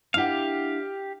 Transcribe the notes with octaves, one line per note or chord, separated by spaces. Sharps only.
D4 E4 G4 F5 F#5